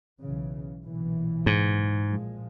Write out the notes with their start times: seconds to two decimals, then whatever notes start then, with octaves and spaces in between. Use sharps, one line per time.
0.20 B1 C#3 E3
0.84 B1 A#2 E3
1.46 G#2
2.08 A#2 F3 G#3